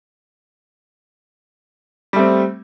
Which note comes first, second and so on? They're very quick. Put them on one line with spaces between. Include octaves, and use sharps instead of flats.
G3 A3 C4